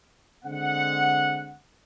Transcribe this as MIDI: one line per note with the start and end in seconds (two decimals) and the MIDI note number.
0.45 1.56 50
0.45 1.56 56
0.45 1.56 60
0.45 1.56 78